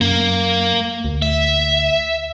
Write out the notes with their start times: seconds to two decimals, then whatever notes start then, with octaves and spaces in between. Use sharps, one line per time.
0.01 F#2 A#3
1.05 D2
1.22 E5